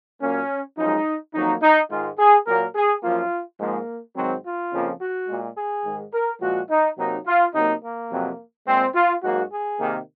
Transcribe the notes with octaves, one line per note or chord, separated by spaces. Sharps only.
A#2 F#3 A#3 C#4
F#2 F3 G#3 D#4
F2 D#3 F#3 A#3 D#4
D#4
G#2 D#3 G#3 F4
G#4
A#2 F#3 A#3 A#4
G#4
F#2 F3 A#3 F4
G#2 F3 G#3 A#3
G#2 D#3 F#3 C4
F4
F2 C#3 F3 A#3
F#4
A#2 G#3
G#4
G#2 D#3 G#3
A#4
A#2 F3 G#3 F#4
D#4
C3 F#3 A#3 D#4
F4
C3 F#3 A#3 D#4
A#3
F2 C3 F#3
A#2 G#3 C4
F4
G#2 F#3 A#3 F#4
G#4
C3 D#3 A#3